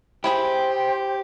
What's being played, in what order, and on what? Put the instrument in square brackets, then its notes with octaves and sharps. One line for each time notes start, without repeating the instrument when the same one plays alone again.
[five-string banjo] E4 G#4 B5 [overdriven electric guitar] G4 [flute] C5 [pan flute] G5